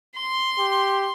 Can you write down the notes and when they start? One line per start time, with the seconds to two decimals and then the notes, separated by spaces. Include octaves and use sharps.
0.16 C6
0.59 G4